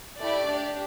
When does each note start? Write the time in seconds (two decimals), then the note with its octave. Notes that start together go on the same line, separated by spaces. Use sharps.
0.20 A3 E4 G4 D5
0.48 D4 G4